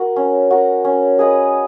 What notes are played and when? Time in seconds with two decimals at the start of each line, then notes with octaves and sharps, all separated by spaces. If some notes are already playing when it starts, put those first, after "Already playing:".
Already playing: F#4 A#4
0.16 C#4
0.51 F#4 A#4
0.85 C#4
1.19 G#4 B4 D#5